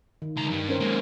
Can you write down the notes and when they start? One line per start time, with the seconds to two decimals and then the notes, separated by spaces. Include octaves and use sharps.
0.22 D#3
0.36 C#2 A#5
0.50 G2
0.69 C#4 A#4 C5
0.80 G#3 A#3